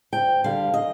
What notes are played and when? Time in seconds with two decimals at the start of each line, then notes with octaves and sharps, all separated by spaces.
0.13 D2 G5
0.44 D3 G3 F5
0.74 D#5